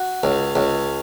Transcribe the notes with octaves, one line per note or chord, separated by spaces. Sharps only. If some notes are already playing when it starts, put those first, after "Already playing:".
Already playing: F#4
C#2
C#2